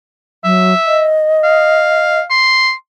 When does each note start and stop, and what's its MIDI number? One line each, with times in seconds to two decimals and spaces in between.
0.44 0.74 54
0.44 1.08 76
0.87 2.20 75
1.44 2.23 77
2.30 2.72 84